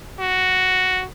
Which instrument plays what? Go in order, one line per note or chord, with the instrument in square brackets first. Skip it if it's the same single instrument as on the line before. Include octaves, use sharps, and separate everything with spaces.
[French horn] F#4